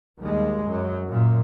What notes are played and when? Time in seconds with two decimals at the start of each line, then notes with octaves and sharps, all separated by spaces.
0.20 D#2 G3 G#3
0.66 F#2 F#3
1.09 F#2 A#2